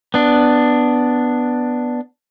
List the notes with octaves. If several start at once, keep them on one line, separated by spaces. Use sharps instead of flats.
B3 D4